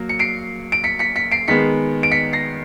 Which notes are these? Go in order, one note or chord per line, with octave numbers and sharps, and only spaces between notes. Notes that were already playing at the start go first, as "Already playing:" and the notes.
Already playing: F#3 A#3
C#7
C7 D7
D7
B6 C#7
B6 C#7
B6 C#7
C7 D7
D#3 G#3 B3 B6 C#7
D7
B6 C#7
A#6 C7